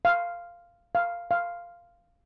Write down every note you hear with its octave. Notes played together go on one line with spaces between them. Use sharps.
F5
F5
F5